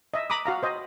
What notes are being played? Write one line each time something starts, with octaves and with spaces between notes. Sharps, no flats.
D#5 E5
A#5 B5 D6 D#6
F#4 F5 A#5
C5 D#5